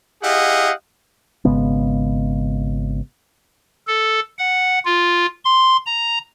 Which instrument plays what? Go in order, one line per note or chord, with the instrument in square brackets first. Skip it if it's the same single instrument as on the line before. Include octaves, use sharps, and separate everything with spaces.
[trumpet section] E4 G4 G#4 D#5 F5 F#5
[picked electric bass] G#1 C#3 G#3 B3
[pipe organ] A4
F#5
F4
C6
A#5